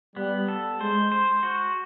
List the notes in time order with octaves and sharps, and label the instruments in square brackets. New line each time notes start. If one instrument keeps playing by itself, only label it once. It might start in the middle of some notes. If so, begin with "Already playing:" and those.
[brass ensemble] G3 [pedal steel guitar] B3
[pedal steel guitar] A4
[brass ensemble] G#3 [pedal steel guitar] C5
[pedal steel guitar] C5
F#4